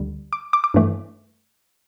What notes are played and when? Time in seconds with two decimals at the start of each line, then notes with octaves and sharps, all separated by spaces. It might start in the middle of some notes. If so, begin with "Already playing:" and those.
Already playing: D2 D3 G3
0.33 D6
0.53 D6
0.64 D6
0.74 G2 E3 A3